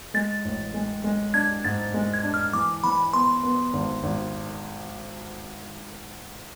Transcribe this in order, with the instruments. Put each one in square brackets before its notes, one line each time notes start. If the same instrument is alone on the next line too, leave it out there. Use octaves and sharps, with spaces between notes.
[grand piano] G#3 [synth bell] A6
[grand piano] A1
G#3
G#3
[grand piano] D4 [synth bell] G#6
[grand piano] G#2 [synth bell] A6
[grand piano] G#3
[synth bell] G#6
[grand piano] D4
[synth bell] F6
[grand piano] E3 [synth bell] D6
[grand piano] E3 [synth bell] B5
[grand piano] B3 [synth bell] C6
[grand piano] B3
G#1
G#1